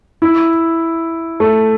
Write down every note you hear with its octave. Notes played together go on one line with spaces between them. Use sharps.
E4
A3